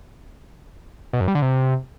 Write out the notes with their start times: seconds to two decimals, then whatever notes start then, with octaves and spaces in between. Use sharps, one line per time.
1.13 B2
1.21 F#2
1.28 G3
1.35 D3
1.42 C3